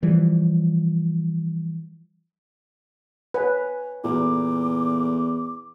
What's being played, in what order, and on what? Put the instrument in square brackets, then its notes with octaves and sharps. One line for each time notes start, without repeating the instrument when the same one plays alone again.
[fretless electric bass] E3 F3 G3
[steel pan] B4 [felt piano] C#5 F#5 G#5
[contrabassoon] E2 [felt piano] A#2 A3 A#3 [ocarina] D6